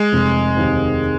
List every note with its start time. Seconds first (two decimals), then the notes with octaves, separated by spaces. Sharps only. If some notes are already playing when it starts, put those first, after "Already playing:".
Already playing: G#3
0.13 F1
0.56 D#2 D#3 C4